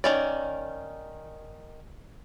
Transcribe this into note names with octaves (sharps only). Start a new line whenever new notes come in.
D#3 C#4 D5